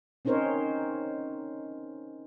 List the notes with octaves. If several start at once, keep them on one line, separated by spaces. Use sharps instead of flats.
C4 C#4 D#4 A#4 C5 C#5